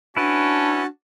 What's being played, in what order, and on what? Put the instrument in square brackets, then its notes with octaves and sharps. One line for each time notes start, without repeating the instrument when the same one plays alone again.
[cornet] C#4 [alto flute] D4 [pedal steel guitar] E4 B4 [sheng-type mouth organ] F#4 A5